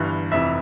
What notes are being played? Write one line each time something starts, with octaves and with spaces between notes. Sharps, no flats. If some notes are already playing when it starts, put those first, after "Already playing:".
Already playing: G1 G2 E3
F1 F2 E3 E5